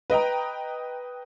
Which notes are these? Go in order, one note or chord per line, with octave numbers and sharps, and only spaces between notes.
B4 D#5 G5 A#5